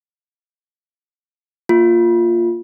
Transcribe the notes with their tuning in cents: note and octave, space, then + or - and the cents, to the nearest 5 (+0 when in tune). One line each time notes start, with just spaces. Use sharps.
A#3 +0 F4 +0